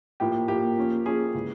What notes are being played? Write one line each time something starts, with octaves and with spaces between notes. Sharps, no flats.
A2 F3 A#3 G4
A2 F3 A#3 G4
F3 A#3 C#4
F3 A#3 C#4 G#4
C#3 E3 G#3